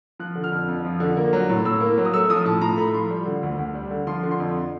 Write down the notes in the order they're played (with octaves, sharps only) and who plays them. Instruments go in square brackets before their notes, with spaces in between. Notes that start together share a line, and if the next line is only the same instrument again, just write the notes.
[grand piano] F3 F#6
D3
F6
F2
F2
F3
D3
A#3
F#3
A2
A2 E6
A#3
F#3
D#6
A3 E6
F3 D#6
A2 A5
A2 A#5
A3 B5
F3 C6
G3
D3
D2
D2
G3
D3
F3 C6
D3
C6
F2